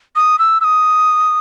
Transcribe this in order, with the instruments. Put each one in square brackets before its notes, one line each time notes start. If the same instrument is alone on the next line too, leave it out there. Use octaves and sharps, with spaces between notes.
[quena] D#6
E6
E6
D#6